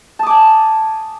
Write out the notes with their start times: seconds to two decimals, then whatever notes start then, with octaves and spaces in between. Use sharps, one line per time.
0.19 A5
0.23 D#6
0.27 D6
0.30 G#5